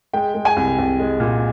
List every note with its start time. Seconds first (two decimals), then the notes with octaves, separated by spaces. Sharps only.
0.13 G#3 G5
0.34 G#3
0.45 G#5
0.56 C2
0.78 C2
0.99 G#3
1.20 A#2